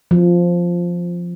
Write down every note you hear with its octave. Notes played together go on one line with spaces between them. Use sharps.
F3